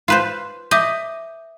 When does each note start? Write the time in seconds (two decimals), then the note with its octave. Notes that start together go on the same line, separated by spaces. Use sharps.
0.08 F4 B4 C5
0.71 D#5 E5 D6 G6